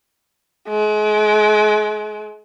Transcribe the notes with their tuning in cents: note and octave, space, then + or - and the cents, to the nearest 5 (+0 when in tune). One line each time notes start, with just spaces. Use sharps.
G#3 +35